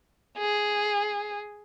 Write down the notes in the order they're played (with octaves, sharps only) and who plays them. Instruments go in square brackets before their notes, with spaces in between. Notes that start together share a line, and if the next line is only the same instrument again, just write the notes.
[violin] G#4